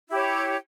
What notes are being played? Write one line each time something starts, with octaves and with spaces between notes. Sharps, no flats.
E4 G4 C#5